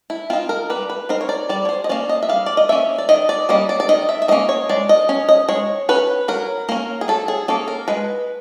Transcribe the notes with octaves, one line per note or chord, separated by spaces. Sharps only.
E4
C4 D#4 F4
A#4
G3 B4
B4
C4 D#4 A#4
C#5
D5
G3 D5
C#5
C5
D#5
A#3 C#4 D5
D#5
E5
G3 F5
D5
D#5
A#3 C#4 E5
D5
D#3 D#5
D5
G3 A#3 C#4 D#5
D5
D5
D#3 D#5
E5
E5
G3 A#3 C#4 D#5
C#5
G#3 D5
D#5
C#4
D#5
G#3 C#5
C#4 B4
F#3 A#4
A#3 C#4 A#4
G#4
F#3 A4
G#4
A#3 C#4 A4
A#4
G#3 B4